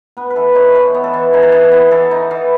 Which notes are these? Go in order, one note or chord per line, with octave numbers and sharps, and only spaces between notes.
B3 B4
B4
E3 A4
D#4 C#5
E3 B4
B3
A4
E3
D#4 G#4
A4
E3 G#4
B3
E3 A4
D#4
E3